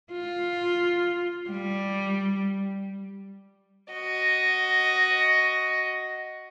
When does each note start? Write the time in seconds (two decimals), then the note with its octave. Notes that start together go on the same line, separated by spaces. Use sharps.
0.12 F4
1.50 G3
3.94 F#4 D#5